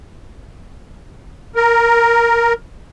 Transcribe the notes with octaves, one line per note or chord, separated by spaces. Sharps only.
A#4